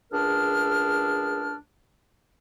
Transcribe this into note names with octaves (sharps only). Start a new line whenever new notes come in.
C#2 D4 G#4 A#4 F6